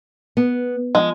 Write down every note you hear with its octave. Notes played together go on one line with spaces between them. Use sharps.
B3
F3 G#3